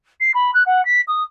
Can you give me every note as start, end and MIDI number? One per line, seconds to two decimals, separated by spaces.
0.20 0.31 96
0.34 0.51 83
0.54 0.63 90
0.66 0.83 78
0.85 1.01 95
1.07 1.23 87